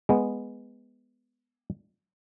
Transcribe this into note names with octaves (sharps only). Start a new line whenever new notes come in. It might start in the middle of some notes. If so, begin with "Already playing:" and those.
G#3 B3